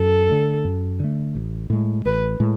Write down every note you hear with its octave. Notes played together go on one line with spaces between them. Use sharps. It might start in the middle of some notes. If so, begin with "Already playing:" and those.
Already playing: F#2 A4
D3 A3
F#2
D3 A3
A1
A2 G#3
A1 B4
A2 G#3